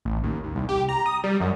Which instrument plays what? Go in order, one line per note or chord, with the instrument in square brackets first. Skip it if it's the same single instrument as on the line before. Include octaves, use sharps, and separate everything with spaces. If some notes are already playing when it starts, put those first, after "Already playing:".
[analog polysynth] A1
D#2
D#2
C2
G4
A#5
D#6
G3
F#2